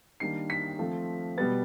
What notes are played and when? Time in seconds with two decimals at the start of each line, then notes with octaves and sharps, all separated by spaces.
0.20 D#3 G3 A#3 D4 C7
0.50 B6
0.79 F3 A3 C4
1.38 B2 G3 B3 A6